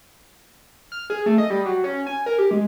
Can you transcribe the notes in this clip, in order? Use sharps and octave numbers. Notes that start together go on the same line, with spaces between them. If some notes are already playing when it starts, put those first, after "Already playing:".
F6
G#4
A3
D#5
G3
F#3
C#4
G#5
A#4
G4
G#3